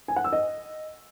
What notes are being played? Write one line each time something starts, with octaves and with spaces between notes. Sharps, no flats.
G#5
F#5
E6
D#5